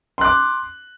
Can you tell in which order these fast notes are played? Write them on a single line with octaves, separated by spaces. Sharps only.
C6 F#6 D6